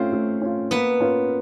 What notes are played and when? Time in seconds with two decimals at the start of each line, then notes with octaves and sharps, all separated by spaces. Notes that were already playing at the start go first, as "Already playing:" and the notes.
Already playing: A3 C4 C#4 F4 C5
0.13 A3
0.42 C#4 F4
0.71 A#3 B3 B4
1.00 C#4 F4 A#4 C#5